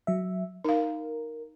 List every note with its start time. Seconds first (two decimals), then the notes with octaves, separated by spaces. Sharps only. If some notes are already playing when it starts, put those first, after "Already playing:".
0.07 F#3 E5
0.64 D#4 A#4 F5